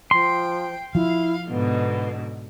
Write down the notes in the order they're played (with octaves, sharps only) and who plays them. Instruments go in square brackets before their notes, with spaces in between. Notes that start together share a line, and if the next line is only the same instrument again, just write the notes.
[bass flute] F3 [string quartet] G5 [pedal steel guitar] C6
[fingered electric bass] F3 [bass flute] E4 [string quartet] F5
[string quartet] G#2 B2 D3 [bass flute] B3